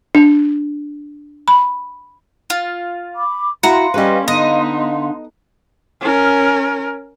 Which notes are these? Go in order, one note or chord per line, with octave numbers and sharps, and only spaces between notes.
D4
B5
F4
B5 D6
E4 F#4 F5 F#5 A#5 C6
G3 C#4 B4 D#5
D3 B3 D#4 D#5
C#4 A#4